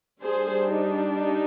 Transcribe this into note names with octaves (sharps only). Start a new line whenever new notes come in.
G3 D4 G#4 C5
D#4
D#4